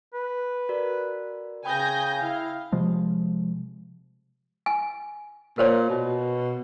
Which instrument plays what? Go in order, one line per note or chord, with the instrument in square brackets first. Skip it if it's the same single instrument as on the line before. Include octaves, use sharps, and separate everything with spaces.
[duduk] B4
[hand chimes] F#4 A#4 D5
[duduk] C#3 [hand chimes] G5 B5 D#6 [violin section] G#5 G6 A#6
[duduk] E4 [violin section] F5
[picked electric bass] C3 F3 G#3
[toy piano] G#5
[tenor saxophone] A#2 [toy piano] A#4 C5 C#5
[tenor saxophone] B2